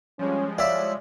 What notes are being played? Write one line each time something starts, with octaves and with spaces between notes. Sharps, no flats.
F3 G3 G#3 C#4
E4 C#5 D5 E5 F5